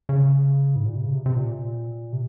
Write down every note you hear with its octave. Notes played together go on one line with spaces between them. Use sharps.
C#3
G#2
A#2
C3
C#3
C3
C3
A#2
C3